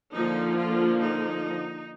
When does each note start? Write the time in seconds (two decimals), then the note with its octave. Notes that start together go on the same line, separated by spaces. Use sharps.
0.14 D3 F3 A#3 D#4
0.57 F4
1.00 D#4